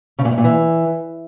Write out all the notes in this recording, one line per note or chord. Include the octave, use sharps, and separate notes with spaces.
C#3
A#2
A2
A#2
E3